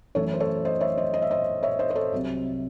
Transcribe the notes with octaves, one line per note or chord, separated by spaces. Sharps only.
F#2 E3 A3 A4 C#5
C5
A4 C#5
C5 D#5
C#5 E5
C5 D#5
D#5
E5
C5 D#5
C#5 E5
C5 D#5
C5
A4 C#5
C2 C3 F#3